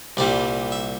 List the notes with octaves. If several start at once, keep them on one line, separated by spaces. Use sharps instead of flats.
C2 A#2 G3 D5
E5